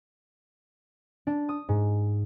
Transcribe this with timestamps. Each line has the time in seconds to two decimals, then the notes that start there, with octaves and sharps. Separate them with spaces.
1.27 D4
1.49 D#6
1.69 G#2